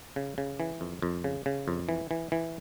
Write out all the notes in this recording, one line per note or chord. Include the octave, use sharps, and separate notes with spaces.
C#3
C#3
E3
F2
F2
C#3
C#3
F2
E3
E3
E3